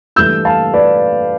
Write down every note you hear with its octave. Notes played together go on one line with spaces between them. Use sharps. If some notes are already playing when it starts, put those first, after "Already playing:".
G2 E3 A3 E6 G6
F5 A5
B4 D5